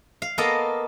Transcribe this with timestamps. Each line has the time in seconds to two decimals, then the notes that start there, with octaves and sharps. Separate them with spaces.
0.22 F5
0.38 A#3 B3 A4 A#4 D#5 A#5